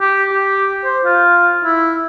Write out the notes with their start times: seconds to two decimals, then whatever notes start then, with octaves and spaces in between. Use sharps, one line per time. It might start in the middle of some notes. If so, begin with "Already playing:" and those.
0.01 G4
0.33 G4
0.84 C5
1.05 F4
1.65 E4